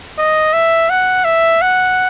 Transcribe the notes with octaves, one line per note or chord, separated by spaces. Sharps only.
D#5
E5
F#5
E5
F#5